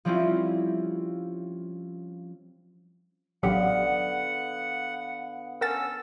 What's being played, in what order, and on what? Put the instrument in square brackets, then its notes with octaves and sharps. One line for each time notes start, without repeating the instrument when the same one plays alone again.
[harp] F3 G3 C4 C#4 E4 F4
[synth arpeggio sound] A1 F#3 G4 [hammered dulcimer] D3 B3 F5 [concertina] F#5
[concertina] C#4 A4 E6 [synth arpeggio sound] A#4 F#5 A6